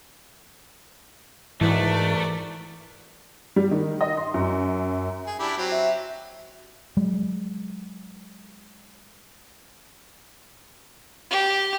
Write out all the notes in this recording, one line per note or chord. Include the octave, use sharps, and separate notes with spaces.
G#2 E3 A3 F#4 A#4 D5
G3
D#3
D#5
C6
F#2
G#4
D4 E4 G4
F#3 C4
E5
F#3 G#3
G4